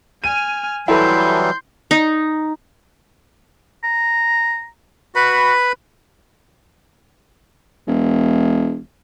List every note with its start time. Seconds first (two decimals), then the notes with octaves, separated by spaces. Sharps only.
0.24 G#5 F6 D#7
0.88 E3 F#3 G3 E4 A4 B4 C6 G6
1.91 D#4
3.84 A#5
5.15 F#4 B4 B5
7.87 E1